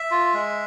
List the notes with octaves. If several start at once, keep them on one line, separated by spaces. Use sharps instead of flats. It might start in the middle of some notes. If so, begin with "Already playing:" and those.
Already playing: E5
F4
G#3